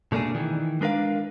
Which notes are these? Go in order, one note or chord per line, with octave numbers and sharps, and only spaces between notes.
B2 A3 A#3 D4 G#4
D#3 E3
G#3 D4 A#4 B4 F5